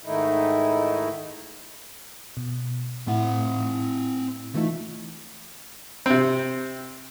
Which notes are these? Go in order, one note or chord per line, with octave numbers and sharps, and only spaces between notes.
G#2 D#3 A3 D#4 E4
B2
A2 C4 E4 F#5
E3 A3 D#4 F4
C3 C4